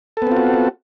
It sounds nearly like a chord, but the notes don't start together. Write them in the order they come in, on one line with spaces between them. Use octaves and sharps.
A4 B3 C4 F4 F#4